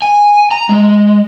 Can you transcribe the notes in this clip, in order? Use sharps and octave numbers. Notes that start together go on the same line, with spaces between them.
G#5
A#5
G#3